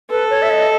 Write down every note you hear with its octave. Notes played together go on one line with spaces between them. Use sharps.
A4 B4
C#5
E5
D#5